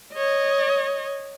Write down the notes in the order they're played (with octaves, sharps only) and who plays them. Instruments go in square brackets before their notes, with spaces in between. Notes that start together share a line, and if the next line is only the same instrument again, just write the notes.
[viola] C#5 D#5